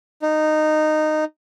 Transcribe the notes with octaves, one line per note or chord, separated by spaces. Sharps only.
D#4